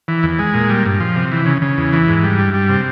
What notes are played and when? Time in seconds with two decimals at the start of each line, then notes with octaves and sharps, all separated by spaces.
0.08 E3
0.23 E2
0.39 G#3
0.54 A#2
0.69 G3
0.85 G2
1.00 F3
1.16 C3
1.32 E3
1.46 C#3
1.62 C#3
1.78 E2
1.93 E3
2.08 G#2
2.23 G3
2.38 G2
2.54 G3
2.69 C3